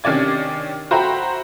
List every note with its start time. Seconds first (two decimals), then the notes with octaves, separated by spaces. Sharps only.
0.04 C3 D#3 C#4 D4 D5 G#6
0.91 F#4 C5 E5 G5 A#5 B5